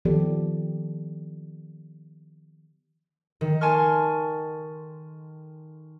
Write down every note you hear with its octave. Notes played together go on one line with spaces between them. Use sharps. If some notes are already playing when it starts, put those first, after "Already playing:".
D#3 F3 B3 G4 A4 D5
D#3
G#5 A5 C6 C#6 F6